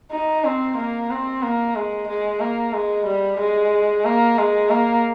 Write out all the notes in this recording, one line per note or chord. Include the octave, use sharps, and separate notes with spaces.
D#4
C4
A#3
C4
A#3
G#3
G#3
A#3
G#3
G3
G#3
A#3
G#3
A#3